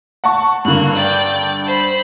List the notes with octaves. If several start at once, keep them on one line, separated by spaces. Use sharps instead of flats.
F#5 A5 C#6
G2 D3 A#3 F#6
D5 G5
C5 B5